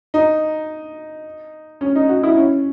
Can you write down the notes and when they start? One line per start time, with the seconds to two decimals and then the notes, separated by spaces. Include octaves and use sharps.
0.14 D#4
1.81 C#4
1.95 D#4
2.09 F#4
2.23 E4
2.37 C#4